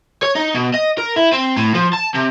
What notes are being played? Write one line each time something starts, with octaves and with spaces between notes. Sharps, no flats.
C#5
D#4
B2
D#5
A#4
E4
C4
A2
F3
A5
C3